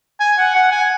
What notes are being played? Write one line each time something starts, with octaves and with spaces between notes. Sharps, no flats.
G#5
F#5
F#5
G#5